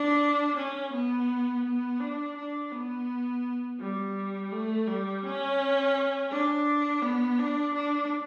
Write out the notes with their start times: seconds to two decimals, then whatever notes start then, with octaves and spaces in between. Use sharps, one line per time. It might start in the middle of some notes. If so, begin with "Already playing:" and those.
Already playing: D4
0.57 C#4
0.93 B3
1.64 B3
2.00 D4
2.37 D4
2.72 B3
3.79 G3
4.51 A3
4.88 G3
5.23 C#4
6.31 D4
7.02 B3
7.38 D4
7.74 D4